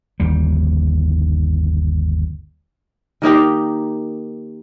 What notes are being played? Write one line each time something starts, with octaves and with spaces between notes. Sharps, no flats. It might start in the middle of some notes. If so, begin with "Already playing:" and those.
G1 D#2 G3
D#3 A#3 D#4 G4